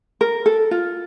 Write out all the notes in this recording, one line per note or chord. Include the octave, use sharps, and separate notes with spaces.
A#4
A4
F4